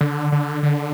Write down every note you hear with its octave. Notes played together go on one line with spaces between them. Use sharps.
D3
D3
D3